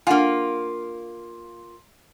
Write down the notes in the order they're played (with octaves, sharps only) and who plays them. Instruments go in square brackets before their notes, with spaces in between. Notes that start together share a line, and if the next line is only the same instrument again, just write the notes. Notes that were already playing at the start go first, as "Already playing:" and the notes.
[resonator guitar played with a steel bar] A#3 F4 [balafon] D4 F#5 G#5